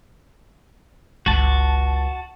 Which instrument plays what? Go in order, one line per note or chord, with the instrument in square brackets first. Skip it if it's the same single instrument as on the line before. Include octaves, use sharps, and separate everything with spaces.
[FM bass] G1 [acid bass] C#2 [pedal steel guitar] F#4 A5